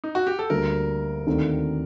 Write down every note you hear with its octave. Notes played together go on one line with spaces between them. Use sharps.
D#4
F#4
G4
A4
D2 D3 G3 A#3 A#4
D#2 D3 A3 C4 D#4